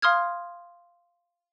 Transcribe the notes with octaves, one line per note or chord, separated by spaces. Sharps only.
F5 C6 D#6 F6 G#6